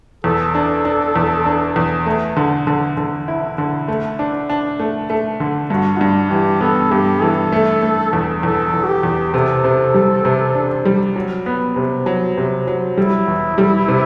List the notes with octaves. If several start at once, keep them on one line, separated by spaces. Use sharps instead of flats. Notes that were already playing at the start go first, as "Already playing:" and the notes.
E2 A4
D4
D4
E2
D4
E2
A3
D3
D3
D3
E4
D3
A3
D4
D4
A3
A3
D3
G2 F#4
G2 D4
E3 G4
B3 A4
G2 G4
E3 A4
A3
A3
E2
E2 A4
E2
F#4
G4
E2
C3 A4
C3
G3
C3
D4
G3
F#3
B3
C3
F#3
C3
F#3
G3 E4
E2
G3
C3